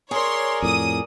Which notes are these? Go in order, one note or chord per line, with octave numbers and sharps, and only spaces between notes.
G#4 A#4 C#5 D5 C6
F2 A2 D#6